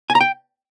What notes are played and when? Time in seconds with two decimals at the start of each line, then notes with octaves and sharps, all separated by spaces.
0.10 G#5
0.15 A#5
0.21 G5